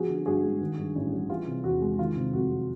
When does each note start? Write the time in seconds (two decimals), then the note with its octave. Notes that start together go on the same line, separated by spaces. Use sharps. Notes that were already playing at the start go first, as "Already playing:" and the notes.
Already playing: F3 B3 F#4 G#4
0.09 D3
0.26 G2 F#4 G#4
0.43 G#3
0.61 D#3
0.78 G2
0.95 A1
1.13 G3
1.29 E3 F4 G4
1.47 C3
1.64 E2 F#4
1.82 G#3
1.99 D#3 F4
2.16 C3
2.33 F2 F#4
2.51 F#3